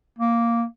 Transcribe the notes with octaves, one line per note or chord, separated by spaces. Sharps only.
A#3